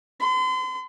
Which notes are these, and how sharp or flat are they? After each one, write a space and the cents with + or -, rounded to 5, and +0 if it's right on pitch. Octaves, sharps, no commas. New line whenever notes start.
C6 -40